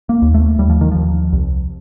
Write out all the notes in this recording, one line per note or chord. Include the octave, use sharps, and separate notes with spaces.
A#3
D#2
A3
D#2 G3
F3
D#3
D#2 F3
C2